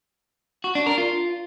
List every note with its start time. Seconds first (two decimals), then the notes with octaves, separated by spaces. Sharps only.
0.64 F#4
0.75 D4
0.87 A#4
0.98 F4